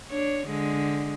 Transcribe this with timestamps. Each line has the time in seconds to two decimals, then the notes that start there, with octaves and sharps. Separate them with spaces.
0.10 D4 C#5
0.47 D3 G#3